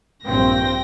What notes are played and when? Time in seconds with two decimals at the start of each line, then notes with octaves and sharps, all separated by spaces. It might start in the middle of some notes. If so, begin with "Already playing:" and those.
0.24 A#1 G2 C4 G5 A#6